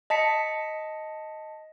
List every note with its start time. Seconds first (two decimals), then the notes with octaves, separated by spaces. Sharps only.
0.10 D#5 A5 B6 C#7